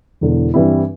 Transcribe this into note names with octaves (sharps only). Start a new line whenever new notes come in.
E1 E2 D3
G2 E3 G3 C4 E4